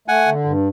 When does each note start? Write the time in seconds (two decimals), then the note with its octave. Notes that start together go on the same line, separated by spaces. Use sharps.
0.08 A3 F#5 G#5
0.27 D3
0.45 G2